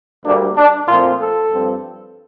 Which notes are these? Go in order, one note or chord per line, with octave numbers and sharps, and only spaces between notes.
D2 D3 G3 A#3 D4
D4
A#2 F3 A3 C4 F4
A4
G2 F3 C4